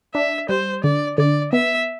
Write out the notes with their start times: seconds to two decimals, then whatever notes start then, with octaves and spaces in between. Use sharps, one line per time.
0.14 D4 E5
0.49 G3 C5
0.83 D3 D5
1.18 D3 D5
1.53 B3 E5